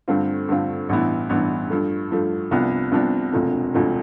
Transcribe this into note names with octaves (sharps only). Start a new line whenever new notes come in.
G2 D3 A3 C4 F4
G2 D3 A3 C4 F4
A1 G2 E3 B3 E4
A1 G2 E3 B3 E4
G2 F3 A3
G2 F3 A3
C2 C3 F3 B3 D4
C2 C3 F3 B3 D4
E1 D2 C3 F3 A3
E1 D2 C3 F3 A3